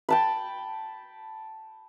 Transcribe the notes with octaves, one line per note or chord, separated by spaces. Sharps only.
G5 A5 B5